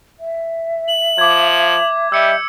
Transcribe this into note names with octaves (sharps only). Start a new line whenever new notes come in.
E5
F#7
F3 D6 G#6
G3 D#5 E5 E6 G6 C#7